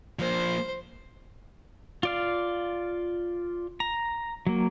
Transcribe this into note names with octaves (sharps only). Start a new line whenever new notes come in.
F3 A#3 C5
F4 D5 F5
A#5
F#3 A#3